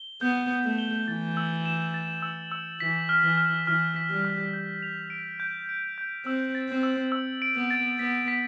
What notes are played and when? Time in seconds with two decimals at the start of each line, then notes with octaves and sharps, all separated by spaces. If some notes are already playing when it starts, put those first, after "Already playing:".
Already playing: G7
0.21 B3 G6
0.50 G7
0.65 A3
0.79 G7
1.08 E3 A6
1.37 E6
1.65 E7
1.94 A6
2.22 E6
2.52 E6
2.80 E3 B6
3.09 F6
3.23 E3
3.37 F6
3.66 E3 F6
3.96 B6
4.10 G3
4.25 F6
4.53 G6
4.83 F7
5.10 D7
5.40 G6
5.69 D7
5.98 G6
6.25 C4 E6
6.55 A6
6.69 C4
6.83 E6
7.12 E6
7.42 D7
7.55 B3
7.70 A6
7.99 B3 B6
8.28 B6